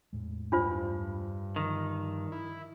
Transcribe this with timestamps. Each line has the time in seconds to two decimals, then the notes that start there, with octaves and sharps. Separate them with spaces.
0.13 E2 A2 G#3
0.52 G2 D4 F4 C5
1.56 D3 D#3 F3
2.32 E4